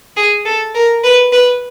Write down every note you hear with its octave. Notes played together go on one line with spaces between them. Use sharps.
G#4
A4
A#4
B4
B4